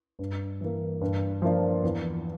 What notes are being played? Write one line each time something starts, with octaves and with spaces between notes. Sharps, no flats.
G2
E3 A#3
G2
F3 A#3 D4 F4
E2